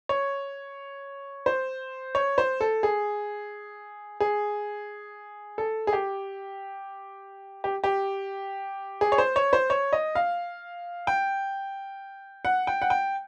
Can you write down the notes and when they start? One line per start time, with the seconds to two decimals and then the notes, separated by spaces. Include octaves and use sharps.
0.09 C#5
1.46 C5
2.15 C#5
2.38 C5
2.61 A4
2.83 G#4
4.20 G#4
5.58 A4
5.87 G#4
5.93 G4
7.64 G4
7.84 G4
9.01 G#4
9.12 C#5
9.18 C5
9.36 C#5
9.53 C5
9.70 C#5
9.93 D#5
10.15 F5
11.07 G5
12.45 F#5
12.67 G5
12.82 F#5
12.90 G5